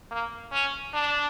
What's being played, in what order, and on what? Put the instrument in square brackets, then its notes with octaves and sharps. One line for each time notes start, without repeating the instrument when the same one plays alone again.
[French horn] A#3
C#4
D4